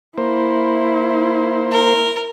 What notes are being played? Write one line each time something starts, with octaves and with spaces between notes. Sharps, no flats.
A#3 E4 C5
A#4